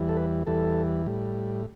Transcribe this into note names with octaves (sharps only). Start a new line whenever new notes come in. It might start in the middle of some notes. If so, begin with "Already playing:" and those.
Already playing: E2 E3 G3
A4
B4
E2 E3 G3 A4
A2 G3